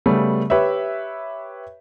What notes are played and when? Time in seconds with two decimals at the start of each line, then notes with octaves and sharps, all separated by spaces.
0.06 C#3 G3 A3 B3
0.50 G4 B4 C#5 E5